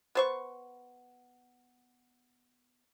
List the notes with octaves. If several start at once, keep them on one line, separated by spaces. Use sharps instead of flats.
B3 C5 C#6